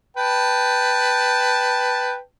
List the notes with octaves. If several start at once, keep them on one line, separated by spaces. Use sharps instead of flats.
B4 G5 A5